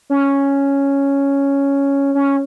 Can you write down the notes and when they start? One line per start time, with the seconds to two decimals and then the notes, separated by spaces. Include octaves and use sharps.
0.10 C#4
2.15 C#4